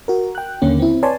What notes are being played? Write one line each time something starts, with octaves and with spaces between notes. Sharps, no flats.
F#4 A#4
G5 F#6
D#2 D3 A#3 C#4
C4 E4
B4 C#5 D5 G#5 A5 C6